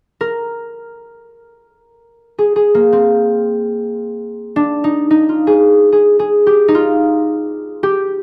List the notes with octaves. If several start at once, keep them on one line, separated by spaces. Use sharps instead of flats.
A#4
G#4
G#4
A#3
C4
D4
D#4
D#4
F4
G#4
G#4
G#4
G4
D#4
F4
G4